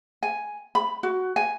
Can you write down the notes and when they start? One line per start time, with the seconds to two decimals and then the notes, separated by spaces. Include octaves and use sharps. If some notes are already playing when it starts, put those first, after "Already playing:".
0.23 G#5
0.75 B5
1.03 F#4
1.36 G#5